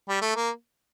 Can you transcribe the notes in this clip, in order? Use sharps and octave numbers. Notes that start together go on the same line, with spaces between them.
G3
A3
A#3